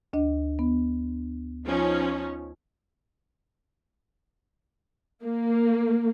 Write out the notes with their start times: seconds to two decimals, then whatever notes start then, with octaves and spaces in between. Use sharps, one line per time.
0.13 D2 D4 D#5
0.59 B3
1.66 F3 C#4 D#4
5.24 A#3